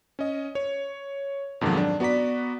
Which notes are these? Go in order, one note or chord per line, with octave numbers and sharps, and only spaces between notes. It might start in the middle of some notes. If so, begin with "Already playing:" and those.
C#4 D#5
C#5
F2 G#2 B2 D#3 F3 F#3
D4
B3 F#4 D5 A#5 B6